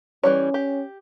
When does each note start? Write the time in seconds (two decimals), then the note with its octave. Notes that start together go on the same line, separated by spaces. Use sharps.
0.24 E3 G3 C#4 C#5
0.54 G4